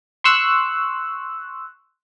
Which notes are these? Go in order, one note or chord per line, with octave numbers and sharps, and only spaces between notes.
C6 C#6 E6 F#6